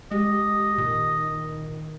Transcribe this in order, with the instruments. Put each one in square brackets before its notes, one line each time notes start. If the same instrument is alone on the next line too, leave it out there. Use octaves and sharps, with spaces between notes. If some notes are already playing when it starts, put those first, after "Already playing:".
[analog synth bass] G#3 [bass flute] G4 [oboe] D#5
[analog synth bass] A#2 [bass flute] D#3